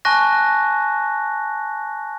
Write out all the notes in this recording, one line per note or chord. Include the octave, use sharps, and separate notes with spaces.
G#5 A5 C#6 F#6 A#6